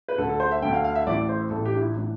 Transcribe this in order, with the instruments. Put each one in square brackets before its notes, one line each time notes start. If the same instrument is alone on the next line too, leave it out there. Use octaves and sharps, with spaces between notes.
[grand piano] B4
D2 D3 A4
A4
C5
E5
D3 G5
D2
F5
F5
E5
A1 A2 E3 D5
C5
A1 A2 E3 A4
G4
D4
E4
A2 E3 D4